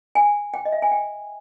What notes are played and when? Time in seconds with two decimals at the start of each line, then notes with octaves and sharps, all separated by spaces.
0.15 G#5
0.54 G5
0.65 D#5
0.72 E5
0.82 G#5
0.92 G5